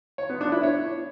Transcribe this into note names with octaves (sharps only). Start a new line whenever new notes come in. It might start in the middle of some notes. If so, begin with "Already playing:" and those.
C#5
B3
D4
E4
C#5